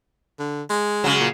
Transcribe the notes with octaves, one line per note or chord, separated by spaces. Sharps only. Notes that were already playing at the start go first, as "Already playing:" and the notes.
D3
G#3
C#3 F#3
A#2